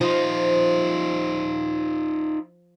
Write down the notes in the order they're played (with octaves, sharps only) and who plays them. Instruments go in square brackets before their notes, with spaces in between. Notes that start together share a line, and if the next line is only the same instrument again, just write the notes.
[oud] F3 [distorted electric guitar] D#4 F4